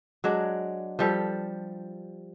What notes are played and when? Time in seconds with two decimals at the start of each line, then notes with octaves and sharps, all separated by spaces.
0.24 F#3 G#3 D4
0.99 F3 G3 A4